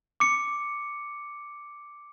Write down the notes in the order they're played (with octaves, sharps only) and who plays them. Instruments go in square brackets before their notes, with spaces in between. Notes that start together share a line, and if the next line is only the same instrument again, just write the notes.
[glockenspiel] D6 C#7